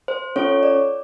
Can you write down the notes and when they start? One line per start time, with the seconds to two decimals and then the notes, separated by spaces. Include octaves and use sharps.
0.08 C5
0.36 C#4 F4 A4 C#5
0.63 D5